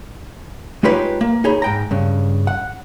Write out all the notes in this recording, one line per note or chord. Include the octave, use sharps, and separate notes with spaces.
G#3 D#4 F4 G4 B4 C#5
A#3
D#4 G#4 C#5 B5
G#2 G5 A#5
G2 C#3
F#5